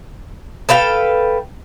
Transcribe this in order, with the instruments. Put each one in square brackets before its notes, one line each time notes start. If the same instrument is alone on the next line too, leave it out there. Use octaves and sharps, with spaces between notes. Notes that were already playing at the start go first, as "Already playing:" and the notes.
[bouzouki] A4 B4 F5 G5